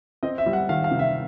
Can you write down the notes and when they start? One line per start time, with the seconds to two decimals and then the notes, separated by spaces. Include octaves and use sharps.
0.23 C4 D#5
0.38 E5
0.46 G3
0.53 F#5
0.69 D#3 F5
0.84 F5
0.91 C3
0.99 E5